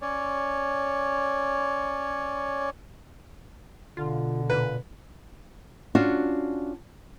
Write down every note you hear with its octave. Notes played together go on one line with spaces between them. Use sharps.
C#4 C#5 D5
B2 D3 F4
A#2 B4
C#4 D4 F4 F#4